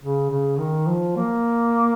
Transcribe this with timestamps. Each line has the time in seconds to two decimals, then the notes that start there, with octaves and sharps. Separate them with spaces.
0.01 C#3
0.30 C#3
0.59 D#3
0.87 F3
1.17 A#3